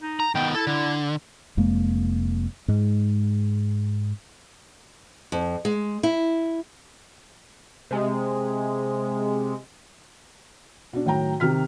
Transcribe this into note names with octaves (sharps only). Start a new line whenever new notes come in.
D#4
A#5
D#3 B3 G5
E4 A4
D3
F1 F2 G#3 A#3
G#2 G#3
F2
G#3
E4
C3 G#3
B2 D4
A2 D#3 F#3 G5 A#5
C3 D#3 F6 B6